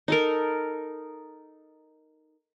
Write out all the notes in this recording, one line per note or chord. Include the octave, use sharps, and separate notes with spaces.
D#4 A4 A#4